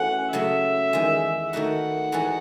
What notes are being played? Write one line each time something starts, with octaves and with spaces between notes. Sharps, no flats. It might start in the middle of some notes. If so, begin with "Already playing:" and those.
Already playing: E3 A3 C#4 F#4 F#5
C#3 F#3 A3 E5
E2 D#3 G#3
D#3 A3 D#4 F#4 F#5
E3 G#3 D#4 F#4 A4